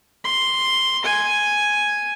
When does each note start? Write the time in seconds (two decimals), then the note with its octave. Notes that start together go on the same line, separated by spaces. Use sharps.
0.24 C6
1.05 G#5